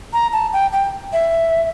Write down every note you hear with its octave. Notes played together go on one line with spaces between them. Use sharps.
A#5
A5
G5
G5
E5